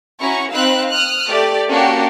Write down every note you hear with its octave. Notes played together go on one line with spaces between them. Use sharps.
C#4 E4 F#4 A#5 C#6
C4 D#4 F5 B5 E6 F#6
D#6 F6 F#6
A3 G4 D5
A#3 C#4 D4 F#4 G4